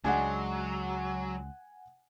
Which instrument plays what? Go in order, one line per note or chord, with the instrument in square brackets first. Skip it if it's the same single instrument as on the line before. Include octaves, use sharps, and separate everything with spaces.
[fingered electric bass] C#2 [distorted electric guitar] F#3 [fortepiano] G#3 D4 [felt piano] F#5 G#5